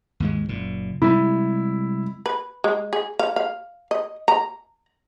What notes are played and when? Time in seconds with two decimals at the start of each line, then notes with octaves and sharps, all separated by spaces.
0.20 D#2 G#2 G#3
0.49 F#1 A#2
1.02 C3 G3 G#3 E4
2.26 B4
2.64 G#3
2.93 G#4
3.19 F5
3.36 F5
3.91 D#5
4.28 A#5